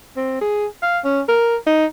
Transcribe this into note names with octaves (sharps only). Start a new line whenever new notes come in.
C4
G#4
F5
C#4
A#4
D#4